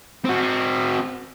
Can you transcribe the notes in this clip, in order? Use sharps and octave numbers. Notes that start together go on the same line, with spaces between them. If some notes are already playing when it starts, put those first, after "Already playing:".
C4 F#4